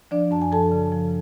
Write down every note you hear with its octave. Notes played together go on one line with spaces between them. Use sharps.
F3 D4 D5
F#2 A5
G#5
F3 A4 A5
C#3
F3